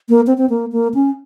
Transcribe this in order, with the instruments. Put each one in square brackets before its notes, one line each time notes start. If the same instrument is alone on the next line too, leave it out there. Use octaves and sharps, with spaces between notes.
[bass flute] A#3
C4
C4
A#3
A#3
C#4